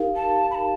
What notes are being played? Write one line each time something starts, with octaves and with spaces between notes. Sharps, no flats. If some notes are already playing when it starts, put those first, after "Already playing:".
Already playing: D#4 G4 A#4 F5
A5
B5
A5